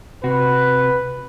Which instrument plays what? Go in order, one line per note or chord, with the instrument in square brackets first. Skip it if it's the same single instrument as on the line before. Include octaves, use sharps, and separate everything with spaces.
[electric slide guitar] C3 F#4 [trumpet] B4